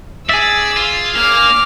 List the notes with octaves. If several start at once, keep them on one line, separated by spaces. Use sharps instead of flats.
G#4 D5 E5 E6
F4
A#3 D6 F6